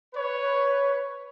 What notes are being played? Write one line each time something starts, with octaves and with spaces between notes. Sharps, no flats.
B4 C#5